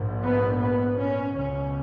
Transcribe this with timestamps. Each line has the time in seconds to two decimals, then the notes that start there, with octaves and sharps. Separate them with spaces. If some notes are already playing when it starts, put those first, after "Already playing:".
Already playing: A#1 G#2
0.22 B3
0.60 B3
0.98 C#4
1.36 C#2 B2 C#4